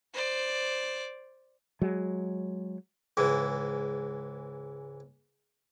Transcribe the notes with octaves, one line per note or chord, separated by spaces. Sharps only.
C5 D5
F#3 G#3
C#2 G#2 E3